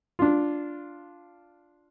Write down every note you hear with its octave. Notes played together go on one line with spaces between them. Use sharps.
D4 F4